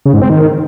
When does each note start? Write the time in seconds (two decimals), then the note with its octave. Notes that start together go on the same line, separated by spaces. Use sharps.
0.05 C#3
0.13 G#2
0.21 C4
0.30 D#3